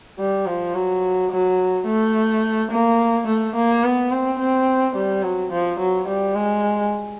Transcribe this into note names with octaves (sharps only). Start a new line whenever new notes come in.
G3
F3
F#3
F#3
A3
A#3
A3
A#3
B3
C4
C4
G3
F#3
F3
F#3
G3
G#3